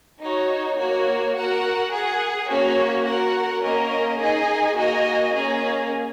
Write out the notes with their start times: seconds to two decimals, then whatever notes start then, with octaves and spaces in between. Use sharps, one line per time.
0.22 D#4 F#4 C#5
0.79 A#3 F#4 C#5
1.36 F#4 A#4 F#5
1.92 G#4 F#5
2.49 A#3 C#4 F#4 C#5
3.06 F#4 A#4 F#5
3.62 A#3 C#4 A#4 D#5
4.19 D#4 G#4 D#5 G#5
4.76 A#3 F#4 D#5 G#5
5.33 A#3 C#4 G#4